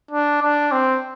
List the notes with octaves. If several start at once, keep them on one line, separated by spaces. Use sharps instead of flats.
D4
D4
C4